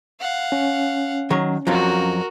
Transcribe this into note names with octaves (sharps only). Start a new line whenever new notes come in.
F5 F#5
C#4
D#3 F#3 C#5
F2 F3 F#3 F#4 A#4